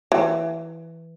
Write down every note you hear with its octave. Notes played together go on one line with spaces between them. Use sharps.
E3